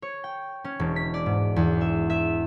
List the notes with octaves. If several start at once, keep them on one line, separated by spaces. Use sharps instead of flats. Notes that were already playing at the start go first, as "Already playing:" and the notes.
C#5
G5
C#4
E1
B6
D5
G#2
E2
E5
E5